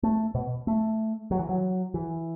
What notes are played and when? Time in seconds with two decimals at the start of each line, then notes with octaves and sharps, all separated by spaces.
0.03 A3
0.35 B2
0.67 A3
1.31 F#3
1.39 E3
1.49 F#3
1.94 E3